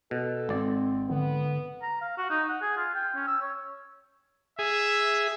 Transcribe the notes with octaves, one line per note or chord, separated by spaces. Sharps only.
B2 A4
G#1 C4 D5
D3 B3
A#5
F5
F#4
D#4
F#5
G#4
F4
G5
C#4
E6
C#5
G#4 E5